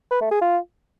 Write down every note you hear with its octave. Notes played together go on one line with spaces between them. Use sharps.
B4
A3
G#4
F4